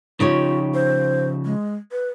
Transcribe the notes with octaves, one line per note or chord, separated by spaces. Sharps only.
C#3 F3 D#4 F4 G4 C#5
C5
G#3
B4